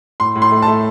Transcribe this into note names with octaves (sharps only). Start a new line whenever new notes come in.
A2 C6
A2
C6
A3
A5
A3